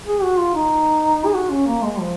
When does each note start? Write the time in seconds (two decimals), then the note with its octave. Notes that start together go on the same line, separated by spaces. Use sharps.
0.06 G#4
0.23 F#4
0.39 F4
0.55 D#4
1.25 G#4
1.34 F#4
1.50 C#4
1.67 A#3
1.83 G#3
1.99 F3